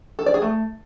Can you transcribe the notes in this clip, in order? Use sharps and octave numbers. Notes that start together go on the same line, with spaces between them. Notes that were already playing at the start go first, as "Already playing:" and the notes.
A4
D5
G#4
A3